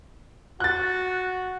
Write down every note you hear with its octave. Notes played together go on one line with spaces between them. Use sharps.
F#4 F#6 A6